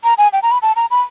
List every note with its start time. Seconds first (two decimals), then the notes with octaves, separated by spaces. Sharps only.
0.04 A#5
0.18 G#5
0.33 G5
0.43 A#5
0.51 B5
0.62 A5
0.76 A#5
0.91 B5